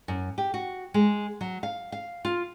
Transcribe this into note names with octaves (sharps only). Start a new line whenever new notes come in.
F#2
G4
F#4
G#3
F#3
F5
F5
F4